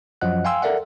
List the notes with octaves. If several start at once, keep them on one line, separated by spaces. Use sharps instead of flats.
F#2 F3 F#3 D#5 F#5 F#6
F5 G5 G#5 C6 E6
A4 A#4 D5 E5 F#5